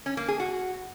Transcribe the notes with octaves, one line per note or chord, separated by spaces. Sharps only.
C#4
A#3
G#4
F#4